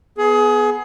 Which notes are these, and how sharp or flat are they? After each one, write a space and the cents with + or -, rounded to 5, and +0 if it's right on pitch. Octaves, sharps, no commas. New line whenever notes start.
B3 +0 G#4 +25